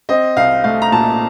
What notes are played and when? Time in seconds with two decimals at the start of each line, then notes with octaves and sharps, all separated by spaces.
0.09 C4 D#5
0.37 C2 F5
0.64 A3 F5
0.82 A#5
0.92 A#2 A5